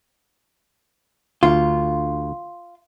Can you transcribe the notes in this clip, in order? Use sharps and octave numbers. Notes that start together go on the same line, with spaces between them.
D2 F4